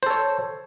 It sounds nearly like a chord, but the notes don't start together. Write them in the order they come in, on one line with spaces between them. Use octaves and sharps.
C5 A4 C#5